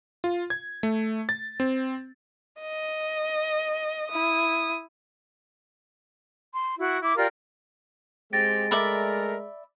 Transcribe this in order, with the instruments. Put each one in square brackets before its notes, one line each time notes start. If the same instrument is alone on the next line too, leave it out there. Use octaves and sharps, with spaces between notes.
[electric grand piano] F4
G#6
A3
A6
C4
[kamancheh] D#5
E4 D#6
[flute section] C6
E4 F#4 F#5
E4 D6
F4 G4 A#4 D5
[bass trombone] G#3 [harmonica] C4 G4 [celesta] A6 A#6 D7
[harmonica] A3 A#4 [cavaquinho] D5 E5 B5